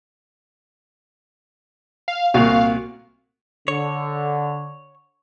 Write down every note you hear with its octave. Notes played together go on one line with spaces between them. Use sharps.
F5
C2 A#2 F#4 F5
D3 C#5